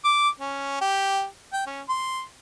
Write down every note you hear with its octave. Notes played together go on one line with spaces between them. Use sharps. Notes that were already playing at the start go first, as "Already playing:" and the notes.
D6
C#4
G4
G5
C#4
C6